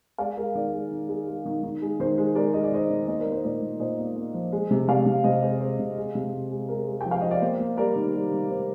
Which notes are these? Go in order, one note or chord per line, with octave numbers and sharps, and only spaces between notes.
G#3 D5 F5
G#3 A#4
D#3 A#4 D5
G#3
D#3
G#3
G#3
D#3
D#3
G#3
D#3 C5
G#3
G#3 A#4 D5
G#3 D#5
D5
D#3 C5 D#5
D#3
A#3 C5 D#5
A#4 D5
A#3
C5
A#2 A#4 D5
A#2
A#2 C5 D#5
A#3
A#3
F3
G#3
C3
C3 D5 F5
C3
C3 C5 D#5
G#3 C5
G#3 C5
C3
G#3
C3
G#3
G#3
G#3 A#4
G#3
F3 G5
F5
F3 D#5
D5
A#3 C5
A#3
G3 A#4 D5
D#3
G3
D#3
D#3 C5